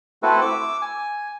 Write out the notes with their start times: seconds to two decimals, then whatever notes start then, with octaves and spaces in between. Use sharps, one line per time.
0.23 A3 C4 E4 F#4 A4 B4
0.41 D6 E6
0.82 G#5